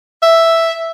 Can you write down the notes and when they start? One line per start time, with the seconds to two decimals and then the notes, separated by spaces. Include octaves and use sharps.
0.23 E5